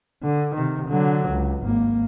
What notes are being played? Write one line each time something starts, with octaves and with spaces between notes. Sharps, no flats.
D3
C3 D#3
D3 F#3
C#2
G#1 A#3